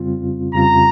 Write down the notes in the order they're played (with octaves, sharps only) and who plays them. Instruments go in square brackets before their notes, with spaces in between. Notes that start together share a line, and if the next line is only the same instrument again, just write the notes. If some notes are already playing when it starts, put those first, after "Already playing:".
Already playing: [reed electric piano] F2 C#3 G3 C4 F4
[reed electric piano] F2 C#3 G3 C4 F4 [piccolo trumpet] A#5